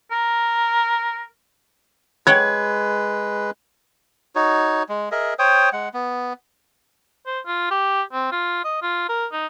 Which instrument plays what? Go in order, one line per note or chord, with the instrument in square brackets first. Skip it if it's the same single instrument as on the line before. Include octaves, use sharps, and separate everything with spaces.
[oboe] A#4
[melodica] G#3 B4 [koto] C#5 F#5 G5 [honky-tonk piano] G#6
[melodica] D#4 F#4 C#5
G#3
G#4 A#4 D#5 E5
C5 C#5 G5 D#6
G#3 F#5
B3
[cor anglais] C5
F4
G4
C4
F4
D#5
F4
A#4
D#4